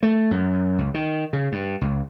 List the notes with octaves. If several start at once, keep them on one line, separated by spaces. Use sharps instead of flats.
A3
F#2
C#2
D#3
C#3
G2
C#2